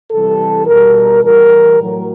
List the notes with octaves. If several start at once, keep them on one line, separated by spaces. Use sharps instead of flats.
C3 E3 G3 A4
B2 G3 A#4
A2 E3 G3 A#4
A2 F#3